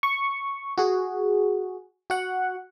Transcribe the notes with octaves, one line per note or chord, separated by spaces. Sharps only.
C#6
F#4 G#4
F#4 F#5